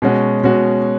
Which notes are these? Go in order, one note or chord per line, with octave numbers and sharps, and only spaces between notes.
B2 G#3 C#4 F#4
B2 G#3 C#4 F#4